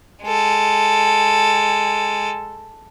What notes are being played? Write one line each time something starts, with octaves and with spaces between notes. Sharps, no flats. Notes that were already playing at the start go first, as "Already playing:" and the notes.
G#3 A4